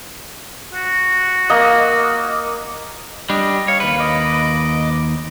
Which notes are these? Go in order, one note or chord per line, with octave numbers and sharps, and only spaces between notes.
F#4
A#3 D#5
G3 D4 D#5
C#5 F5
D#2 B4
D#5 D6